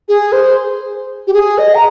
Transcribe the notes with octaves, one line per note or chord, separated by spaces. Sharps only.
G#4
C5
G4
G#4
D#5
A#5